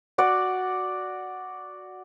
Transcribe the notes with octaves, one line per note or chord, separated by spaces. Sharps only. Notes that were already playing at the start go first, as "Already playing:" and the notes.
F#4 D5 F#5